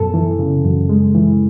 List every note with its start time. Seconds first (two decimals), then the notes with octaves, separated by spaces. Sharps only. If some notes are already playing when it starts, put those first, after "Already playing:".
Already playing: F#2 B2 A4
0.14 E3
0.39 C#3
0.64 F#2
0.89 G#3
1.15 E3